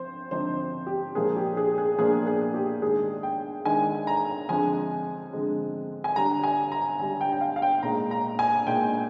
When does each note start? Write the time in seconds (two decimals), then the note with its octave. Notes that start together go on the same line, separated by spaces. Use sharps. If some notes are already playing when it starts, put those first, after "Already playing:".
Already playing: F3 C4 C5
0.31 D3 F3 C4 D#4 C5
0.87 G4
1.15 A#2 F3 A#3 D4 G#4
1.36 G4
1.57 G#4
1.78 G#4
1.99 A#2 F3 A#3 D4 G#4
2.27 G#4
2.54 G4
2.82 D#3 G#3 D4 G#4
3.23 G5
3.65 D#3 G#3 D4 G#5
4.07 A#5
4.49 D3 F3 G#3 C4 G#5
5.33 D3 F3 G#3 C4
6.04 G#5
6.16 D3 G3 D4 A#5
6.44 G#5
6.72 A#5
6.99 D3 G3 D4 G#5
7.21 G5
7.33 G5
7.41 F5
7.56 F5
7.62 G5
7.83 A#2 G#3 D#4 A#5
8.11 A#5
8.39 G#5
8.67 A#2 G#3 D#4 G5